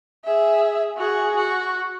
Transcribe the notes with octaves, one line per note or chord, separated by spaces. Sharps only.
G#4 E5
F#4 G#4
F#4